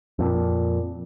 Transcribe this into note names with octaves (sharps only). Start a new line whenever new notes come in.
F2 A#2